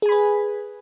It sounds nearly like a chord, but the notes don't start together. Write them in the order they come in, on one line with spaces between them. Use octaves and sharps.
G#4 G#5 B5 B4